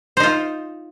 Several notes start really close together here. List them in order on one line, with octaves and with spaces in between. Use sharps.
C5 D#4 F4